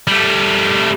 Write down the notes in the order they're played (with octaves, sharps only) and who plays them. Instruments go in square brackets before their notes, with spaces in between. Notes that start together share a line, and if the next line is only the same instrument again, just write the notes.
[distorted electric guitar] G3 A3